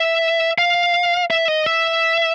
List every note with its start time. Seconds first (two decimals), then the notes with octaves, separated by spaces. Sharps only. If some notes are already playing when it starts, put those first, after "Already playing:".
Already playing: E5
0.58 F5
1.30 E5
1.48 D#5
1.66 E5